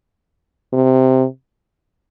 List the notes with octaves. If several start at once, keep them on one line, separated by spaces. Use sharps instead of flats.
C3